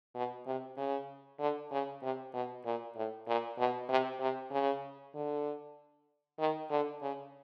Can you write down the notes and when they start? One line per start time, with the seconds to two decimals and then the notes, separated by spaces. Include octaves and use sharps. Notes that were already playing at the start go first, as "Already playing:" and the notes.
0.15 B2
0.46 C3
0.78 C#3
1.40 D3
1.72 C#3
2.03 C3
2.34 B2
2.65 A#2
2.96 A2
3.27 A#2
3.59 B2
3.89 C3
4.20 C3
4.51 C#3
5.15 D3
6.39 D#3
6.71 D3
7.02 C#3